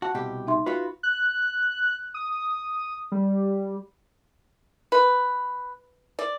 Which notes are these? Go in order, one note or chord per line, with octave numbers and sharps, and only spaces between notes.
F#4 F#5 A5
C2 B2 G4
D#4 E5 C6
F4 F#4 B4
F#6
D#6
G3
B4
D5